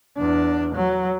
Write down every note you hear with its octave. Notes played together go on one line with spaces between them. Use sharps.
E2 D4
F#3